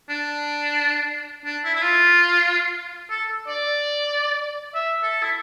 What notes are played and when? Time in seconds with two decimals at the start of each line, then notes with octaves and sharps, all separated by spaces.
0.10 D4
1.45 D4
1.65 E4
1.75 E4
1.82 F4
3.10 A4
3.47 D5
4.74 E5
5.03 A4
5.23 E4